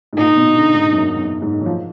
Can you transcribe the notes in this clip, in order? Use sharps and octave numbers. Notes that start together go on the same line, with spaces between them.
G#2
A#2 D#4
B2
D3
G#2
F#2
F#2
G#2
F#3
F3